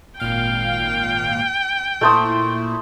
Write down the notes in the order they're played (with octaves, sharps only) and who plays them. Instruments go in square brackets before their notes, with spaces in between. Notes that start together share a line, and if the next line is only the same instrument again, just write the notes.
[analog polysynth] G#1 A#2 F5 [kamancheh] G5
[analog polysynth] A#2 E4 [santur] A3 C5 D#6